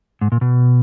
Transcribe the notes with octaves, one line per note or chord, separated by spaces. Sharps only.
G#2
A#2
B2